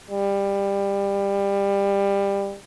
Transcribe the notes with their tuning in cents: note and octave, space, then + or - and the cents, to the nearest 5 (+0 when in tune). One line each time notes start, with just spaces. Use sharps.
G3 +20